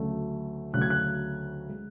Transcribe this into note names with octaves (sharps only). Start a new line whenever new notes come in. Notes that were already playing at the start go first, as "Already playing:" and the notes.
Already playing: D2 C#3 F#3 A3
D2 C#3 F#3 A3 F#6
G#6
F#6
G#3